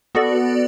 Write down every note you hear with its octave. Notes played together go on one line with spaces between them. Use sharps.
B3 F#4 A4 D5